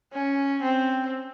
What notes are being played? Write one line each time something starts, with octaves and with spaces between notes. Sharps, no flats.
C#4
C4